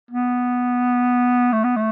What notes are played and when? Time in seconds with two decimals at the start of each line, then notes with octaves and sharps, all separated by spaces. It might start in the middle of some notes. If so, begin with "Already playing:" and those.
0.11 B3
1.53 A3
1.64 B3
1.76 A3